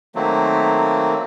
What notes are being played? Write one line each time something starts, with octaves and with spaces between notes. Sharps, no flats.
D#3 F#3 A3 A#3 C4